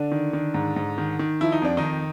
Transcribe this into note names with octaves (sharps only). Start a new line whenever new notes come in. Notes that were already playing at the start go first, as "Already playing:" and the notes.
Already playing: D3 D4
D#3
D#3
G#2
G#2
D#3
D#3
F3 E4
D#4
F2 D4
D#3 D#4
F2